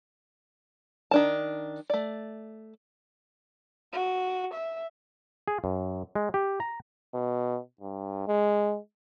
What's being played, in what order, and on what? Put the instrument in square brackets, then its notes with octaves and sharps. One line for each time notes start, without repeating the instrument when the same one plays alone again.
[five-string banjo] D#3 D4 A5
A3 D5
[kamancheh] F#4
E5
[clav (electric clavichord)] G#4
F#2
G#3
G4
A#5
[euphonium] B2
G2
G#3